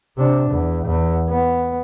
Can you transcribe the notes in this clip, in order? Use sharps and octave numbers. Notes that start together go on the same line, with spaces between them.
C3 D4
E2
E2
B3